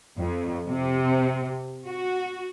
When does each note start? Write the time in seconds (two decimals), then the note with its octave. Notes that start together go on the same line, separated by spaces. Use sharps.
0.17 F2
0.68 C3
1.87 F#4